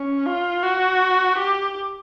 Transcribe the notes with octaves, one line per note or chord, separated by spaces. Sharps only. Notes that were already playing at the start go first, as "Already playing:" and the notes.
Already playing: C#4
F4
F#4
G4